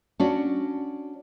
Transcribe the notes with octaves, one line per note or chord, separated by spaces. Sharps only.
C#4 D4 F#4